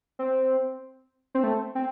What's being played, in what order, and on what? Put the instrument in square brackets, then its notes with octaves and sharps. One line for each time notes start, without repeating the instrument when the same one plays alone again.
[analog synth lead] C4
C4
A3
C4